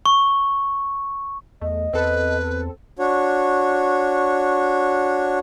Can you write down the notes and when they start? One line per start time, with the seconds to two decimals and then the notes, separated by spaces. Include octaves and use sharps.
0.06 C#6
1.61 E2 A3 D#5
1.93 E2 C4 A4 B4
2.99 D4 F#4 C#5